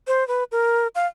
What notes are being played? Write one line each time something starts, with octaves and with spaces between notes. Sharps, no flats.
C5
B4
A#4
F5